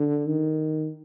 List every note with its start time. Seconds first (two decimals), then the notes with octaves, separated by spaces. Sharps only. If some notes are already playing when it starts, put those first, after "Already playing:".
Already playing: D3
0.27 D#3